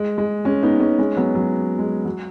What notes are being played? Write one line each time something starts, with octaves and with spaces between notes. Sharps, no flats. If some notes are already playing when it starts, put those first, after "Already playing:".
Already playing: G#3
G#3
G#3 C#4
B3 D#4
G#3 C#4
G#3 C#4
F#3 B3
F#3
G#3
F#3